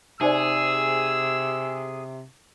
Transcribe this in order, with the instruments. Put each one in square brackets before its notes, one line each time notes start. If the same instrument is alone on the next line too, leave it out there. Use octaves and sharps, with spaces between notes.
[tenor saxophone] C3 [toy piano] D#4 C5 D5 [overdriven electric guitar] G#4 [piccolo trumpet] E6